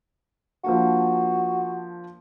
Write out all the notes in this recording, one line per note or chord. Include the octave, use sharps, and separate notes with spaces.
F3 A#3 D4 F#4